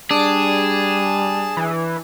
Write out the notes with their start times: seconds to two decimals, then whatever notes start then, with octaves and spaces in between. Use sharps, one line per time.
0.11 G3 D4 G#4 A5
1.57 E3